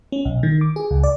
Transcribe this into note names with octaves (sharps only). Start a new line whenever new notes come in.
C#4
B1
D#3
D6
G#4
C#2
D5